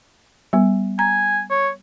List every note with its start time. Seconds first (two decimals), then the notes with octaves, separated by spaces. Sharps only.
0.53 G3 B3
0.99 G#5 A#5
1.50 C#5